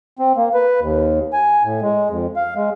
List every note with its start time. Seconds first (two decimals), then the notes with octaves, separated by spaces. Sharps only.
0.19 C4
0.36 A#3
0.54 B4
0.80 D#2
1.33 G#5
1.63 A2
1.82 G#3
2.10 F2
2.36 F5
2.56 G#3